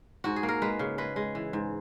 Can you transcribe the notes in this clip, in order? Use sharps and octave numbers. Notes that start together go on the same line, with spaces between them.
G#2 F#4
G#4
A#3
A#4
G#3 B4
C#3
G#3 B4
G#3
E3
G#2